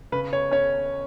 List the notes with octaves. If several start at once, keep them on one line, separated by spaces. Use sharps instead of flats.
C#3 B4
C#5
C#4 C#5